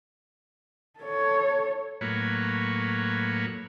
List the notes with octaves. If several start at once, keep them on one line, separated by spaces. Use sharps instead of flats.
A4 C#5
A2 F#3 A#3 B4 C#5